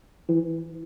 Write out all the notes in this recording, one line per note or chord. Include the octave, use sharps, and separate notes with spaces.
E3